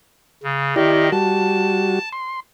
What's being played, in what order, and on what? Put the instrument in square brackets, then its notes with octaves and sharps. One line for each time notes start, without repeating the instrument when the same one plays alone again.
[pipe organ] C#3
[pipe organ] D#3 D#5 [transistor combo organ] E4 G4 D5
[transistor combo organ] G3 F#4 [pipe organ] A5
[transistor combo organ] C6